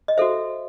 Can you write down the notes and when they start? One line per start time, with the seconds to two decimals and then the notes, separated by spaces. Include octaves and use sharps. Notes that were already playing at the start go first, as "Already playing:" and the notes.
0.08 D#5
0.18 F#4 A4 C5 E5